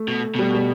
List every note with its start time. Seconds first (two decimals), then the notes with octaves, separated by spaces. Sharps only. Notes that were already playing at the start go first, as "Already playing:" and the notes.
Already playing: A3
0.08 B2
0.35 B2 G3
0.54 G3